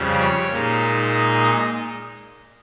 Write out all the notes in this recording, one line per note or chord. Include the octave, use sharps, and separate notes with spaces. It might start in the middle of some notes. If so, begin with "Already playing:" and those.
Already playing: F2 C#3 G3
C#5
A#2 G#3 D#4
D#5
D#5